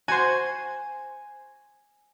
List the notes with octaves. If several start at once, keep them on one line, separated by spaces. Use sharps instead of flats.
F#4 C5 G#5